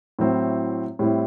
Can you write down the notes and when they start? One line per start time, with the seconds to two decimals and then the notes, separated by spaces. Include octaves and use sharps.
0.19 A2 F#3 C4 E4
0.99 A2 G3 C4 E4